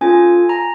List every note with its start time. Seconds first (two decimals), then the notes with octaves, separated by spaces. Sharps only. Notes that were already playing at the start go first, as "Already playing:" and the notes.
0.01 C#4 F4 A4 G#5
0.49 A#5